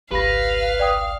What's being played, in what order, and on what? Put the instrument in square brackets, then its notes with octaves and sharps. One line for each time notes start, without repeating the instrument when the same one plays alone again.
[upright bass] G#1 C#2 [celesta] G4 B5 A#6 [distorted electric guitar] B4 [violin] F5
[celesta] D5 G5 D#6